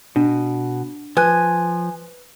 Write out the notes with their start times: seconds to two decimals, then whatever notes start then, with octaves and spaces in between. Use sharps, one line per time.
0.16 B2 D4
1.17 F3 B4 G#5 F#6